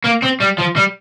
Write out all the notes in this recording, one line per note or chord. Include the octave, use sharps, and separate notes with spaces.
A#3
C4
G3
F3
G3